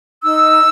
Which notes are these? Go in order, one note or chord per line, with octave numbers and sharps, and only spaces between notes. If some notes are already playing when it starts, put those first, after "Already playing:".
D#4 E6